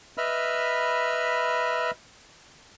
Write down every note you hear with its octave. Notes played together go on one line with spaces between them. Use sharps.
B4 D#5 E5 B5 E6 F6